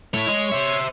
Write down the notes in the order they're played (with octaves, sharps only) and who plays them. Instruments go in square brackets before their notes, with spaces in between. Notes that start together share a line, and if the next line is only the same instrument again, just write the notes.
[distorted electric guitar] A3 E4 [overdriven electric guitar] C#5
[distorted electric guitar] G#3
C5 E5